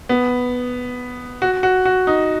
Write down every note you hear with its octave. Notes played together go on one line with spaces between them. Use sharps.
B3
F#4
F#4
F#4
D#4